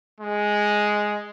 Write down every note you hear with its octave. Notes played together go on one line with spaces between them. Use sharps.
G#3